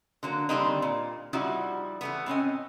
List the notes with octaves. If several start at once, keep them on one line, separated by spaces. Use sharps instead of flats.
D3 F#3 A#3
D3 D#3 G3 A#3 C4 D#4
A#2
F3 G3 D#4 E4 F#4
E3 A3 B3
A2 C4 C#4 D#5